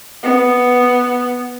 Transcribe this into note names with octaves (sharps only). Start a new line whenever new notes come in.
B3